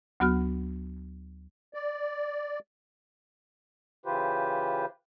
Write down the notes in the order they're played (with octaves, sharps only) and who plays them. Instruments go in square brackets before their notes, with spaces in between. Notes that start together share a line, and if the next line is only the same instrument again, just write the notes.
[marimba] D2 F#3 B3 F#4 F6
[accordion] D5
C#3 E3 F4 G4 B4 C5